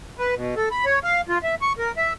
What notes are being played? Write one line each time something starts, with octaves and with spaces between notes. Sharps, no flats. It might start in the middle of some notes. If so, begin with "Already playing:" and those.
B4
B2
A4
B5
C#5
F5
F4
E5
C#6
A#4
E5